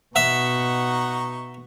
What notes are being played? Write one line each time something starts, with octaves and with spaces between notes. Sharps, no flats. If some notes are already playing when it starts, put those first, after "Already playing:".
B2 D#4 E5 F#5 A#5 C#6